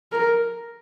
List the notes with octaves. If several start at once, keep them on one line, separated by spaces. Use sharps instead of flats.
A#4